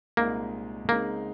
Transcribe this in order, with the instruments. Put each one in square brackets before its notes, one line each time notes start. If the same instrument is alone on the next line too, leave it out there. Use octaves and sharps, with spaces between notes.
[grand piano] C2 A#2 G#3 C4 D#4 [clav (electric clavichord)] A#3
[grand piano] C#3 G#3 C4 D#4 [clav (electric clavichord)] A#3